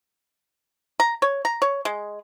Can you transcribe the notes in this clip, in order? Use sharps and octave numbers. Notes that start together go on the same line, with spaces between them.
A#5
C#5
A#5
C#5
G#3